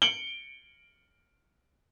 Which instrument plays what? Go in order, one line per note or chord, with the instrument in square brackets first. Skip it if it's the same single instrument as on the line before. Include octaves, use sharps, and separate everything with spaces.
[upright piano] C#7 D7 F#7 G7